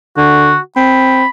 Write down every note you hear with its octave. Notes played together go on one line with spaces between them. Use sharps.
D3 F#4
C4 B5